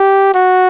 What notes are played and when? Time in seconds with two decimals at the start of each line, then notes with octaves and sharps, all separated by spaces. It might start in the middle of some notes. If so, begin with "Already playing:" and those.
Already playing: G4
0.34 F#4